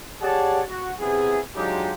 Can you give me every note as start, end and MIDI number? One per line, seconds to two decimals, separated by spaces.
0.21 0.62 67
0.21 0.62 68
0.21 0.62 73
0.21 0.62 74
0.21 0.62 78
0.21 0.62 81
0.69 0.92 66
0.99 1.40 48
0.99 1.40 59
0.99 1.40 64
0.99 1.40 68
1.56 1.93 54
1.56 1.93 56
1.56 1.93 62
1.56 1.93 63
1.56 1.93 65
1.56 1.93 67